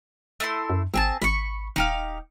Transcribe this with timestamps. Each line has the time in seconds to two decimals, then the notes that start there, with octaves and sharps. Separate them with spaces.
0.40 A3 E4 C6
0.70 F#2
0.94 G#1 C4 G#4 A5
1.22 G#1 B5 C#6
1.76 D#1 D#4 G4 F5